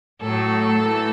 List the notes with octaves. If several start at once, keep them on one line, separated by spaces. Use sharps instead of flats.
A2 F#3 A3 A4
E3 A3